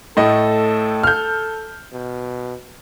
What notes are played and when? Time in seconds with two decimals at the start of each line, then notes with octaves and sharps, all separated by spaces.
0.17 A2 A3 A4 D#5
1.04 F6 G6
1.92 B2